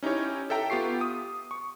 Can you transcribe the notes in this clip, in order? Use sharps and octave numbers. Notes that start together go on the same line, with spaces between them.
C#4 D#4 E4 G4 C#5
A4 E5 G5 A#5
B3 F4 G4 C#6 C7
D#6
C#6